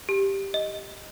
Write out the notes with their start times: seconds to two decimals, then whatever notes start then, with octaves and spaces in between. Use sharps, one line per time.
0.09 G4
0.54 D#5